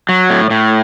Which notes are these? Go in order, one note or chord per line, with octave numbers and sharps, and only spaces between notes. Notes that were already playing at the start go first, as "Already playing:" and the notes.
F#3
A2
A2